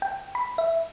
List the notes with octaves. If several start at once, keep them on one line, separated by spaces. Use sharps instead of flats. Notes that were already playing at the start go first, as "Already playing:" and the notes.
G5
B5
E5